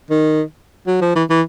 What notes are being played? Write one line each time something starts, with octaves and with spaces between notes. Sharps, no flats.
D#3
F#3
F3
E3
E3